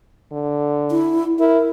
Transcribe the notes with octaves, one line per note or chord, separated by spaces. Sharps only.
D3
E4
E4 A#4